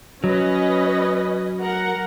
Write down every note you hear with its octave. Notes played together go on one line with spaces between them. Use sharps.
F#3 C#4 B4 D#5
A#4 F#5 A#5